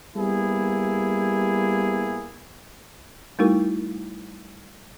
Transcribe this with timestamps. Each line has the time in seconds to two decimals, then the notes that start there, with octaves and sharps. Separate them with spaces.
0.17 G3 A#3 B3 E4 G#4
3.39 G3 A3 D#4 E4 F#4 A#4